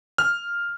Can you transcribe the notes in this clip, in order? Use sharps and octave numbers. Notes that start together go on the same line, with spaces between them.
F6